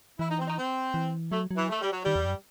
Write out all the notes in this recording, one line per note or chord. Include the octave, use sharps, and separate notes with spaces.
E3 E4
D#4
C4
D#4
C4
E3
F#3 A3
F#3
E3
A3
G3
F#3
D#3 G3
E2
F#2